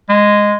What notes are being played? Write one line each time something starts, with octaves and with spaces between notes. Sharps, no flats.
G#3